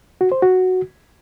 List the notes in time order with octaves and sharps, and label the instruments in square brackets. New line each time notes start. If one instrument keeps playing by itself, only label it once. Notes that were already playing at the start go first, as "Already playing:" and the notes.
[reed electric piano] F#4
C5
F#4